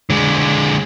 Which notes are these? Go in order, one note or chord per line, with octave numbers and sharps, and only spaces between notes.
D3 G#3